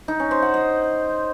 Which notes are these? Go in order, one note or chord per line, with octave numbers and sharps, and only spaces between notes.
D#4
C#4
C5
F#5
D#5